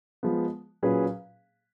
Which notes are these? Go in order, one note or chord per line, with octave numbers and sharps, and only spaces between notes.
F3 G#3 B3
A#2 F#3 C#4 G#4 B4